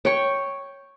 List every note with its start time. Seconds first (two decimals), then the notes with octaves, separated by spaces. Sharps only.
0.05 C#5 G5 C#6